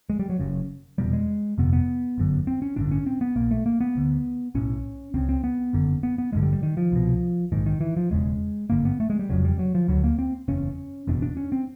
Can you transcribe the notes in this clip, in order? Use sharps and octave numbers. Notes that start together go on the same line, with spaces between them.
G#3
G3
F#3
F#1 F#2 C#3
F1 E2 B2 G3
G#3
G1 F2 C3 B3
B3
G1 F#2 D3
C4
C#4
A1 G2 D3 D4
C#4
C4
B3
A#1 A#2 A#3
A3
A#3
B3
D2 D3
B1 A2 C#4
C#2 C#3 C4
C4
B3
F#1 F#2 D3
B3
B3
A1 G2 D3 G#3
G3
G3
D#3
F3
C2 B2
A#1 G#2 D#3
D#3
E3
F3
E1 E2 C#3 G#3
G#1 G2 D3 A#3
B3
A3
G#3
G3
F1 F2 C#3 F#3
G3
F#3
F3
D2 D3 F#3
A#3
C4
F#1 E2 C#3 C#4
F#1 E2 B2 D4
D4
C#4
C4